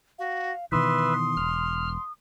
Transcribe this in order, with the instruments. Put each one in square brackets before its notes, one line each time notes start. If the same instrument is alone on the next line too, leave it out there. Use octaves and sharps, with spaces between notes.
[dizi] F#4 [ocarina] F5
[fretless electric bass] B2 D#3 E3 [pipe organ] B4 E5 [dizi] C6 [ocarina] D#6
[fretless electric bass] E1 [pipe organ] F6